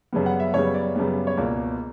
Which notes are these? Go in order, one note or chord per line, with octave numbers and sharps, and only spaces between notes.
F#2 C#3 G3 B3
F#5
E5
F#2 C#3 G3 B3 C#5
D5
F#2 C#3 G3 B3
C#5
C#2 B2 A#3 D5